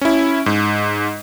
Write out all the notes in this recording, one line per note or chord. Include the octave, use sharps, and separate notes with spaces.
C#4 E4
G#2